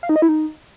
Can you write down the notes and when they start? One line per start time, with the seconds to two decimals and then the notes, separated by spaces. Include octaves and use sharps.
0.03 F5
0.09 D#4
0.16 D#5
0.22 E4
0.29 D#4